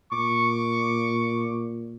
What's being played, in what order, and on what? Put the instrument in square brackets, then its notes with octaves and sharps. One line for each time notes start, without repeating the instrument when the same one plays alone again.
[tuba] A#2 [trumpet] C#6 [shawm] D6